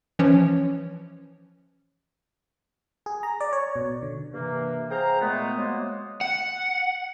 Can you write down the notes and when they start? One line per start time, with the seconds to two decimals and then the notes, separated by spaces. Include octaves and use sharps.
0.19 E3 F3 C#4 C#5
3.06 G#4
3.23 A#5
3.41 D5
3.53 C#5
3.76 B2
4.02 D3
4.33 G2 C3 E3 A#3
4.91 G#4 C5 F5 G5 A#5
5.20 A#2 G#3 A3 B3
5.57 F#3 G#3 A#3 B3 C5 D#5
6.21 F#5